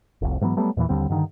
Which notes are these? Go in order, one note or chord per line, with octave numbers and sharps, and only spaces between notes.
F1 C2
G#2 E3 F#3 B3
F#3 G3 A3 B3
E2 A#2 D3 E3
D#2 D3 G3 C4
G2 D3 D#3